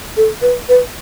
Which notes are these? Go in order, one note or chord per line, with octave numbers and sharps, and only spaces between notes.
A4
B4
B4